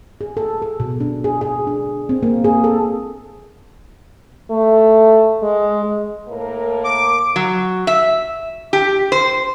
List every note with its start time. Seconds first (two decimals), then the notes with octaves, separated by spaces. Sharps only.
0.21 G#4
0.37 A4
0.62 A4
0.80 B2
1.00 D4
1.24 G#4
1.41 G#4
1.67 D4
2.09 C4
2.23 A#3
2.44 G#4
2.64 A4
4.50 A3
5.43 G#3
6.28 A2 A#3 A#4
6.84 D6
7.36 F#3
7.87 E5
8.73 G4
9.12 C5